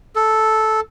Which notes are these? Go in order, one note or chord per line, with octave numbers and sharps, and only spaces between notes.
A4